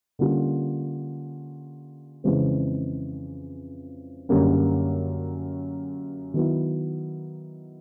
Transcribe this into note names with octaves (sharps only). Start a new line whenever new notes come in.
D3 G3 A#3 C#4 F4
F2 C#3 E3 G#3 C4
F#2 D3 G3 A#3 C#4
D#3 F#3 B3 E4